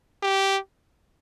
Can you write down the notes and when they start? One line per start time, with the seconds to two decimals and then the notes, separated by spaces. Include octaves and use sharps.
0.23 G4